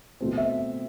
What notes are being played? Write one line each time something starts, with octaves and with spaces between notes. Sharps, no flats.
B2 A3 C4
E5